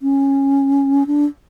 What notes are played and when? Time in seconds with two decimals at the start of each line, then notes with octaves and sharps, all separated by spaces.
0.02 C#4
1.07 D4